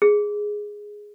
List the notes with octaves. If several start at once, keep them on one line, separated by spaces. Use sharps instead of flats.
G#4